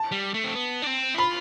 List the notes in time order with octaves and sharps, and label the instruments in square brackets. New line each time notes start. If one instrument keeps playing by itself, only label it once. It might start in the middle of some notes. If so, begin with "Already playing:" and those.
Already playing: [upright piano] A5
[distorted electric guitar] G3
A3
C4
B3
D4
C4
E4
[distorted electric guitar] F4 [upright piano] B5